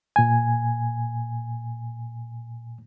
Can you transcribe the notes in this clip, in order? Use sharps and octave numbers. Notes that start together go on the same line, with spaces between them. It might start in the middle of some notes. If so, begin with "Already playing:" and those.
A#2 G#5